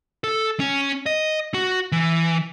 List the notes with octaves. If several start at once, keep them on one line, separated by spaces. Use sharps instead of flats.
A4
C#4
D#5
F#4
E3